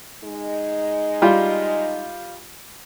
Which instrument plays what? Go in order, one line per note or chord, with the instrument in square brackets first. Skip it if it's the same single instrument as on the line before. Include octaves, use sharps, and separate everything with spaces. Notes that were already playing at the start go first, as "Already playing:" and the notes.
[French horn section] G#3 D#4
[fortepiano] G3 F4